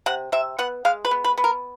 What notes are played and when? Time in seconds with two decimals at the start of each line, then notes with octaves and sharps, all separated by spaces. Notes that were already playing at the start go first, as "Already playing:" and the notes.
0.06 C3 F#5
0.32 C3 E5
0.59 B3 F#5
0.85 G#3 F5
1.05 B4
1.11 B3
1.24 B4
1.38 B3
1.44 A#4